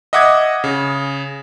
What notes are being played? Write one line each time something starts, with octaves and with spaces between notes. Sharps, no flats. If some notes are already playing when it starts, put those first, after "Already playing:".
D#5 E5 F#5 D6 D#6 G#6
C#3